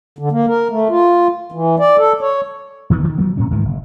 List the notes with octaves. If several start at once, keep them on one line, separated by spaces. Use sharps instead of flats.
D3
A#3
A#4
A3
F4
E3
D5
A4
C#5
D#1 D#3 E3 B3
D2 D3 D#3
F3 F#3 G#3 B3
A2 C3 C#4
D2 G#2 D#3 E3
F#1